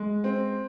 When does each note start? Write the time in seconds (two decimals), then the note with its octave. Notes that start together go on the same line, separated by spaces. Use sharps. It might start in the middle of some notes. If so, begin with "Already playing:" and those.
Already playing: G#3
0.24 C4